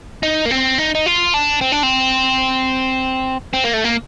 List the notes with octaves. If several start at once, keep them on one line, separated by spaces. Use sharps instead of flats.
D#4
A#3
C4
D#4
D#4
F4
D4
C4
D4
C4
C4
A#3
A3
A#3